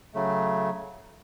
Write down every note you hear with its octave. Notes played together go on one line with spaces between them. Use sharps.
C#3 F#3 A3